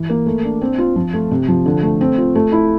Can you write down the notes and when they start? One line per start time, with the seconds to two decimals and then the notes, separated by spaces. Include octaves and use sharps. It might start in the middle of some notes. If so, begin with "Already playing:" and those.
Already playing: E3
0.10 A#3
0.26 A3
0.44 D4
0.61 C4
0.78 F4
0.96 F3
1.14 A3
1.31 C3
1.48 F3
1.66 D3
1.82 A3
2.01 C4
2.18 F4
2.35 A3
2.52 E4